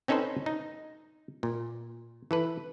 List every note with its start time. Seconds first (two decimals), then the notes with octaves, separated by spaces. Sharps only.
0.08 C4 C#4 D#4 A4 B4 C5
0.46 D#4
1.43 A#2
2.31 E3 A4 B4